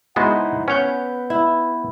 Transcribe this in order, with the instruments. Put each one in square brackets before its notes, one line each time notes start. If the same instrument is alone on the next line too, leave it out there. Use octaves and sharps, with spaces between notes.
[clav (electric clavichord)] G#3 B3 F#4 [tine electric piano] D#4 E4 C5 [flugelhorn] F#5
[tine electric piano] B3 G6 [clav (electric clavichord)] C#4 C#5 F#5 [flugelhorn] B4
[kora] E4